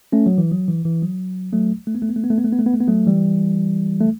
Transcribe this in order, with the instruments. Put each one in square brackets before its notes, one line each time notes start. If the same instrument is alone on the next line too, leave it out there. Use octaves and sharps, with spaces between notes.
[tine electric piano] A3 C#4
F#3
E3
F#3
E3
E3
F#3
F#3 A3
A3
B3
A3
B3
A3
B3
A3
B3
A3
B3
A3
B3
A3
B3
F#3 A3
E3 G3
A3